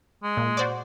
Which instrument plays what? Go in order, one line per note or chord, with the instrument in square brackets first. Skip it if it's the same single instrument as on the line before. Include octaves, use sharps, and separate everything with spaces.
[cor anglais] G#3
[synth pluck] A#2
F#4 C5 D5